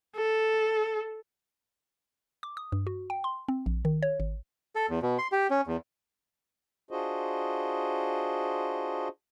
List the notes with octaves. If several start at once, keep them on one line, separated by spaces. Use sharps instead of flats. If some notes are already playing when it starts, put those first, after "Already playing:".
A4
D6
D#6
G2
F#4
G5
C6
C4
A#1
D#3
C#5
G#1
A4
E2
B2
C6
G4
C#4
E2
D4 F4 F#4 G#4 C5 D#5